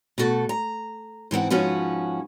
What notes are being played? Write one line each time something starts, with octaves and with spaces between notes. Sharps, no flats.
B2 A3 F#4 A4
A#5
G#2 E3 C4 F#5
G#2 F3 C#4 F#4 B4